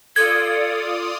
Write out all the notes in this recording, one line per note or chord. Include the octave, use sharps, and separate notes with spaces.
F4 A4 D5 D#6 G#6